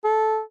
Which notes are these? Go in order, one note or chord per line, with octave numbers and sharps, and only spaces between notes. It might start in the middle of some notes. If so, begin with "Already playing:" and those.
A4